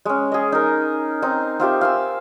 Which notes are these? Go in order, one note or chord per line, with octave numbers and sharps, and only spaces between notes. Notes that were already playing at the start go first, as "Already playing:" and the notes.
G#3 C#4
G#4 D#5
D#4 A#4
C4 D#4
C4 F4 G4 E5
F5 G#5 E6